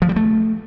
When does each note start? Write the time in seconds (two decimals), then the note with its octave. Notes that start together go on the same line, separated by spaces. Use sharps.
0.02 F3
0.09 G3
0.16 A3